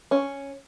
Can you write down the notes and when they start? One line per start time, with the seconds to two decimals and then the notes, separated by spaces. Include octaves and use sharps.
0.11 C#4